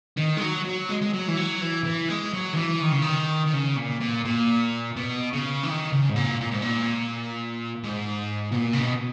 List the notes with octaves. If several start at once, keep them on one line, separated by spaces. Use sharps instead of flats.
D#3
G#3
F#3
F#3
G#3
G#3
F#3
E3
F#3
E3
E3
G#3
F#3
D#3
E3
D#3
C#3
D#3
D#3
C#3
A#2
A#2
A#2
B2
C#3
E3
D#3
C#3
G#2
A#2
A#2
G#2
A#2
G#2
B2
A#2
C#3
B2